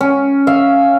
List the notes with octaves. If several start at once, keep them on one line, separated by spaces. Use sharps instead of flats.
C#4
E5 F5